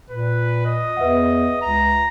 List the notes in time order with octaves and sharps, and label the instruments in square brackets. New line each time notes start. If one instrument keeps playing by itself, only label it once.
[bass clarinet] A#2 [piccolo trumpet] B4
[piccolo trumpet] D#5
[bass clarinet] E2 [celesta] B4 E5 F#5
[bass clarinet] C#2 [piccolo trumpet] A#5